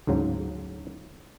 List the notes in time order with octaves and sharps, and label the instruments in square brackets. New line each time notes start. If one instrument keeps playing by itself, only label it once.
[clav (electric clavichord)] D2 G#2 C#3 F#3